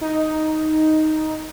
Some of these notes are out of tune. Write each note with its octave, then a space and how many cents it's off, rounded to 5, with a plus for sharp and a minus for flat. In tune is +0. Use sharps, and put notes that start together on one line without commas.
D#4 +5